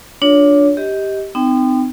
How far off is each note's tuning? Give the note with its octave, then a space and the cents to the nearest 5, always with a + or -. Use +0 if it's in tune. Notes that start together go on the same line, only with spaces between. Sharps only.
D4 +0 F4 +25 C#5 +30
G4 +0 D#5 +20
C4 -40 D#4 -35 G5 +5